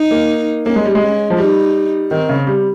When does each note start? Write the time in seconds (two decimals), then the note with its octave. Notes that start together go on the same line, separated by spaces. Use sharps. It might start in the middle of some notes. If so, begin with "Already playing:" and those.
Already playing: D#4
0.11 A#3
0.66 A#3 C#4
0.76 G#3
0.85 G3
0.95 G#3
1.02 C#4
1.30 F3
1.38 G3 D#4
2.11 D#3 C4
2.29 C#3
2.47 G3